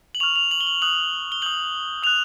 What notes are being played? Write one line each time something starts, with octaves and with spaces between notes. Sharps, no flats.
F#7
C#6 F6 F7
F7
F#7
G7
F#7
D#6 F#6 F#7
G7
D#6 G6 F#7
D#6 F#6 F7